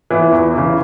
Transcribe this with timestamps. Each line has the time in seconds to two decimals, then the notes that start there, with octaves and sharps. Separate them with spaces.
0.10 E3 B3 E4
0.32 E2
0.54 C#3 E3